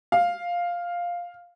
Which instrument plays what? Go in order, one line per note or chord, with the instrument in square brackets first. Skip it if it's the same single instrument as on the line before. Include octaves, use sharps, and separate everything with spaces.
[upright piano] F5